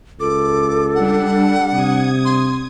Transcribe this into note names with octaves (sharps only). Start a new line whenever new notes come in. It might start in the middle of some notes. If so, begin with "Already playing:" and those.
C#2 A4 D6
G3 D4 F#5
C3 D#6 G#6
C6